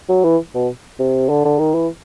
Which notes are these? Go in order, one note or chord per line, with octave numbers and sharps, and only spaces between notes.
F#3
E3
B2
C3
D3
D3
D#3
E3